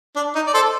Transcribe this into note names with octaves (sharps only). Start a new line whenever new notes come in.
D4
D#4
D5
A4 C5